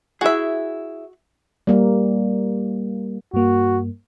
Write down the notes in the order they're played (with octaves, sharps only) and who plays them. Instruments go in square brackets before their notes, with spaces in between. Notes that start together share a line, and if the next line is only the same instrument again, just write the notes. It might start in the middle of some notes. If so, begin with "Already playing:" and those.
[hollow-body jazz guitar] E4 G#4 [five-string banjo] F#4 E5
[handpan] G3 A#3
[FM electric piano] G2 A#3 [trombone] F#4